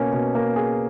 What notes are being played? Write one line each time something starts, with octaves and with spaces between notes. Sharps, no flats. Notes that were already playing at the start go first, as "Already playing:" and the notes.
Already playing: B2 A#3 C#4
B2
A#3
G#4